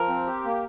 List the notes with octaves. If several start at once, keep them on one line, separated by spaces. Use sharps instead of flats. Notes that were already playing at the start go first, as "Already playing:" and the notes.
Already playing: F3 A#4
C4
G4
A#3